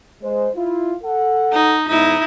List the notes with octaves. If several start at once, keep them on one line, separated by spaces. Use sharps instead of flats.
G#3 C5
E4 F4
A4 F#5
D#4
E2 G#2 D#4 E4